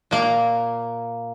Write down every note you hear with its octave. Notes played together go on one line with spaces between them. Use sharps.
A#2 A#3